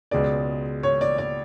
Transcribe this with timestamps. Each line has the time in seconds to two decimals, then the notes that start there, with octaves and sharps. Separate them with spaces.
0.11 C#2 B2 G#3 D5
0.83 C#5
1.01 D5
1.18 D5